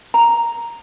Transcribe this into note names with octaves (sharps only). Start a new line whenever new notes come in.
A#5